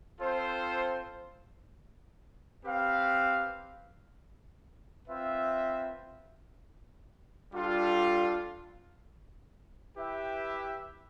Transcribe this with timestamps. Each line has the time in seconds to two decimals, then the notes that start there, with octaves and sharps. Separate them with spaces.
0.20 C4 F4 A4 C5
2.64 C4 G4 B4 F5
5.08 C4 F4 B4 E5
7.51 G3 D4 F4 A4
9.96 E4 G4 B4 E5 G5